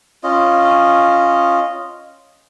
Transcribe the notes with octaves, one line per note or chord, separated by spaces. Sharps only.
C#4 F4 D#5